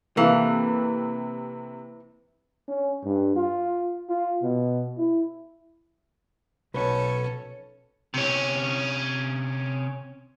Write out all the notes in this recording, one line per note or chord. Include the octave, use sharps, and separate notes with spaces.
C3 E3 A#3 A4 B4 F5
C#4
G2
F4
F4
B2
E4
B1 C#4 A4 B4
C3 C#4